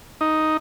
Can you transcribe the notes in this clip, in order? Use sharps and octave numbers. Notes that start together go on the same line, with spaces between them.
D#4